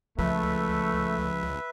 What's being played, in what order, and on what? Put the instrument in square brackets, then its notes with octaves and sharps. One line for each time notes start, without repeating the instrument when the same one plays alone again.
[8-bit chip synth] C#2 [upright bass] F3 [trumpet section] A3 [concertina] B4 E5